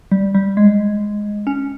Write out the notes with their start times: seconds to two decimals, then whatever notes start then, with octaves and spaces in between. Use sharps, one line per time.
0.12 G3
0.35 G3
0.57 G#3
1.47 C#4